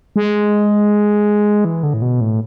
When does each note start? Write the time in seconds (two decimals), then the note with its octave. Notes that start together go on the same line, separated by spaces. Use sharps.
0.16 G#3
1.65 E3
1.83 D3
1.94 A2
2.02 B2
2.21 A2